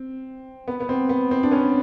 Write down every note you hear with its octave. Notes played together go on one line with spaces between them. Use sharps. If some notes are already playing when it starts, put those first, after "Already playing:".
Already playing: C4
B3
B3
C4
B3
C4
D4
B3 C#4